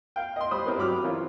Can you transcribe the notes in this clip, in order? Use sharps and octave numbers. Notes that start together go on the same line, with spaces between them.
F5 G5
D#5 C6
G3 C5 B5 D#6
C4 E4 A#4 B4 C#5
G2 F#3 B5 D6 D#6 F6
E3 C4 F4 A#4 C#5